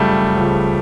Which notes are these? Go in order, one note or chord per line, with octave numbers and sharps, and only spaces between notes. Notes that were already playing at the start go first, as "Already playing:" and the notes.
Already playing: F#2 C#3 F3 G3 A3
C#2 C#3 F3